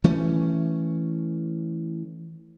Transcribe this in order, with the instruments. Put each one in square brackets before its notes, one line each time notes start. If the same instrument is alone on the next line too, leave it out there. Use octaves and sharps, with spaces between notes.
[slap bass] E3 A3 C#4